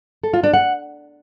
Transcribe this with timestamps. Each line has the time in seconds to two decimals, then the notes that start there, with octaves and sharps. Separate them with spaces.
0.23 A4
0.34 F4
0.44 D4
0.54 F#5